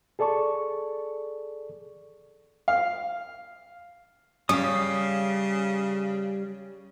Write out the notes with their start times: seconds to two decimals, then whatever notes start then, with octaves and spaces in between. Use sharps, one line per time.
0.19 G#4 A4 D5 A5 C#6
2.68 F5
4.49 C#3 G3 C#4 F5 D#6